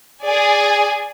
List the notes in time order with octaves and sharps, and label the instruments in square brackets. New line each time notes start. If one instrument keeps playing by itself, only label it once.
[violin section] G#4 D5 G#5